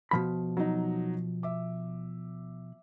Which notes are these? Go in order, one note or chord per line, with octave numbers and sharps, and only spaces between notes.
B2 F3 B5
F#3 D#4
E5 D6